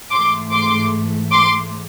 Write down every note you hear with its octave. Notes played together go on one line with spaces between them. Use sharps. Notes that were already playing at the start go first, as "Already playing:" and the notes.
G#2 E3 A3 C6 D6
C6 D6
C6 D6